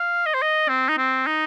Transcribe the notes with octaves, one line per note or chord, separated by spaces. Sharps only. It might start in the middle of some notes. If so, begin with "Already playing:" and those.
Already playing: F5
D#5
C5
D#5
C4
D#4
C4
D#4